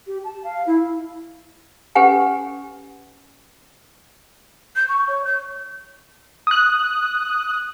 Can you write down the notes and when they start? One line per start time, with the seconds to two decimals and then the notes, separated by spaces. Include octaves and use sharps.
0.07 G4
0.24 A5
0.44 F5
0.67 E4
1.95 C#4 G4 A4 B4 F#5 G#5
4.76 G6
4.89 C#6
5.08 C#5
5.25 G6
6.47 D#6 F#6